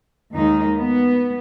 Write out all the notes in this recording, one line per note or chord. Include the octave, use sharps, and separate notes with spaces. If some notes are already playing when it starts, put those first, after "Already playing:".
D#2 D#3 G#3 D#4
B3